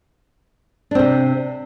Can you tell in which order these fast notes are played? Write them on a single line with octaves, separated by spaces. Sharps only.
D4 C4 C3